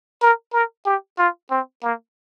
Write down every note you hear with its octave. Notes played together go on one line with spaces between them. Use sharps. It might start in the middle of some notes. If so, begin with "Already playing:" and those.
A#4
A#4
G4
F4
C4
A#3